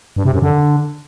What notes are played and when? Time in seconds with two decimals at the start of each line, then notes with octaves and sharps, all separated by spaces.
0.16 G2
0.25 C3
0.34 F#2
0.42 D3